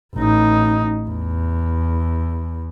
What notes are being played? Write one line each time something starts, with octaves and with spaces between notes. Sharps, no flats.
A1 D#4
E2